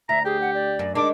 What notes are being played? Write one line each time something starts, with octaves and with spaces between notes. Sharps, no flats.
D2 E5 A#5
G4 G#4
F#5
D5
F#2
D#3 G#3 D4 D6